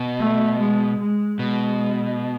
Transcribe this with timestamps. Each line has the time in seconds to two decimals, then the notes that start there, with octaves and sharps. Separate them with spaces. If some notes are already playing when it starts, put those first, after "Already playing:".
Already playing: B2
0.19 A3
0.60 G#3
1.00 G#3
1.39 B2 G#3